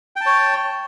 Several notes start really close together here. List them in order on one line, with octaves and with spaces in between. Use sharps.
G5 A5 C#5